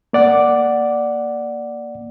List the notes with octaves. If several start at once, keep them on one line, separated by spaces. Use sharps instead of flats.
A#3 D5 F#5 D6